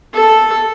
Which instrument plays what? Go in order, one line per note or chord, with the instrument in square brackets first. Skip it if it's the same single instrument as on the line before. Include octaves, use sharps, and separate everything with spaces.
[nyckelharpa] A4